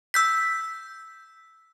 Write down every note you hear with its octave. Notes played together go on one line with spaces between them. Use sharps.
E6 G6 B6